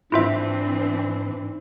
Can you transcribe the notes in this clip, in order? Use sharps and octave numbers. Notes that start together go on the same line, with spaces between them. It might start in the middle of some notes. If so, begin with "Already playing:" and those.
G#2 E3 C4 D4 E4 F4 E5